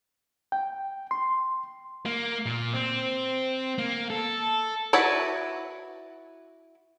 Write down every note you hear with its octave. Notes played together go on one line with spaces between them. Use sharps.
G5
C6
A#3
A#2
C4
A#3
A4
E4 F#4 B4 C#5 D5